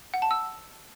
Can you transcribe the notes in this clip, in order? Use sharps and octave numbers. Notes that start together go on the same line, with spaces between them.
F#5
A5
E6